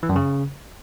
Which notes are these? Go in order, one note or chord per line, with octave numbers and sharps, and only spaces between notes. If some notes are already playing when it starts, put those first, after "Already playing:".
E3
F#2
C#3